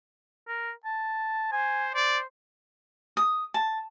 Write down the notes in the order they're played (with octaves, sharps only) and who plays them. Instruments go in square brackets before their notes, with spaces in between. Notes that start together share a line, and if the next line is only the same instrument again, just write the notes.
[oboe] A#4
A5
[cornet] C5 [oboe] G#5
[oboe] C5 [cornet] D5
[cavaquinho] D#6
A5